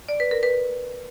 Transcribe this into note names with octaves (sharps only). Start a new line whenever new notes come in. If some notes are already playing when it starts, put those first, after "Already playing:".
D5
B4
A#4
B4